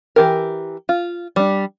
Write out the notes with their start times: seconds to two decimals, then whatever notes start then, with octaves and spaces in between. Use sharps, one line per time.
0.16 E3 G4 A#4
0.89 F4
1.36 G3 D4